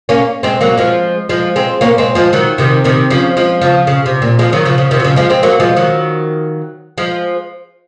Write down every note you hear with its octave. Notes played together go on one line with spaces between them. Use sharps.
A#3 C#4
G#3 C4
F#3 A#3
F3 G#3
F3 G#3
G#3 C4
A#3 C#4
G#3 C4
F3 G#3
D#3 F#3
C3 D#3
C3 D#3
C#3 F3
F3 G#3
C#3 F3
C#3
C3
A#2
F3 G#3
D#3 F#3
C#3 F3
C#3
C3 D#3
F#3
C#3 F3
F3 G#3
G#3 C4
F#3 A#3
F3 G#3
D#3 F#3
F3 G#3